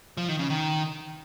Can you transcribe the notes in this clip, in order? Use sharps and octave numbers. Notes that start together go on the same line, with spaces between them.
F3
D#3
C#3
D#3